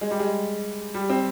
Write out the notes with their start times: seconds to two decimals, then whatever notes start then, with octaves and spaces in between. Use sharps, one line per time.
0.01 G#3
0.11 G3
0.19 G#3
0.94 G3
1.10 C4